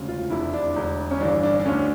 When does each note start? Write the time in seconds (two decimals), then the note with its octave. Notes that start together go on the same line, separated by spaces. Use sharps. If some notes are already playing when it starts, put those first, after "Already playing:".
Already playing: E1 D2 C#3
0.08 F4
0.30 F1 E2 D3 E4
0.54 D4
0.76 E1 E2 D3
1.11 C#4
1.20 G1 G2 E3 D4
1.43 D4
1.60 D4
1.66 D2 D3 C#4